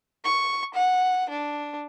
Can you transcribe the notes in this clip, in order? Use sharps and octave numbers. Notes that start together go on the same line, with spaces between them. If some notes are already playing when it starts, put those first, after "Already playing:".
C#6
F#5
D4